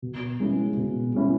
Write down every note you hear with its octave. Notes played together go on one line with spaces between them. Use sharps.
B2
G#3 C#4 E4
B2
G#3 C#4 E4